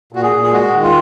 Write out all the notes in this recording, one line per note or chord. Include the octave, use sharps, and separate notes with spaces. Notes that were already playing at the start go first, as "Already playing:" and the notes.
A#2 F#4
G#4
A#2
G#4
G#3 F#4
D#3
F4